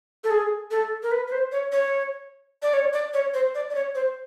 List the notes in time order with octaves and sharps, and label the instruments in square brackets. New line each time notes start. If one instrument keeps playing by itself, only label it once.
[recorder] A4
G#4
A4
A#4
B4
B4
C5
C#5
C#5
D5
C#5
D5
C#5
C5
D5
D5
C#5
C5